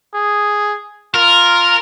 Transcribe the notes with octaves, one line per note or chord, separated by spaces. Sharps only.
G#4
F4 A#4